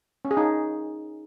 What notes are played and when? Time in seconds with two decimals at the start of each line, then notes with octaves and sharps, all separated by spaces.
0.25 C#4
0.31 G#4
0.37 D#4